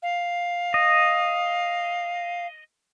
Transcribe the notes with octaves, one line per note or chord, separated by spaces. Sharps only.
F5
D#5